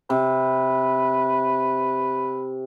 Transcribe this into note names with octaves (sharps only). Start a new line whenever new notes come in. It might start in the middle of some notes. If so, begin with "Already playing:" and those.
C3 B4